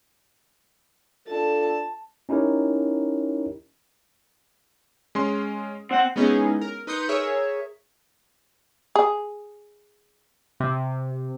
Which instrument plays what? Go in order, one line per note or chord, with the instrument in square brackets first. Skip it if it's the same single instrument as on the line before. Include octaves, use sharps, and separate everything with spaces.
[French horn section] D4 F4 A4 [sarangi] A5
[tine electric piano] C#4 D#4 E4 G4 A#4 C#5
[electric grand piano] G#3 C#4 C6
[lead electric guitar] C4 [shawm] F#5
[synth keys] G#3 B3 C#4 D#4 E4 G#4
A#4
D#4 B4 C6 D#6 G6 C#7
G#4 A#4 C#5 E5
[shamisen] G#4
[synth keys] C3